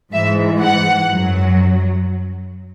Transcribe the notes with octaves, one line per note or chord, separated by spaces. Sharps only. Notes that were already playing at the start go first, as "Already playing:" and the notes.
G#2 E3 E5
F#5
F#2 F#3